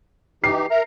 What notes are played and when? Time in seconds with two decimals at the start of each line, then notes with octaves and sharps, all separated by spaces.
0.44 E3 D#4 G4 C7
0.71 A#4 E5 A#5